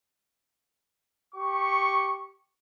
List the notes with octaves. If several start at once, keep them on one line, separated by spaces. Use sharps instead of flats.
G4 C#6